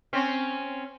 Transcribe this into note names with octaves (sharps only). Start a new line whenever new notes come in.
C4 C#4